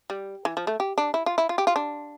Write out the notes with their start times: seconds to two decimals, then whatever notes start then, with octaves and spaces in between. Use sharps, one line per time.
0.10 G3
0.45 E3
0.57 F3
0.67 A3
0.80 G4
0.98 D4
1.14 E4
1.26 F4
1.38 E4
1.49 F4
1.58 G4
1.67 F4
1.76 D4